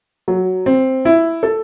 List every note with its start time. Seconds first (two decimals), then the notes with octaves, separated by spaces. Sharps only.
0.28 F#3
0.66 C4
1.05 E4
1.43 A4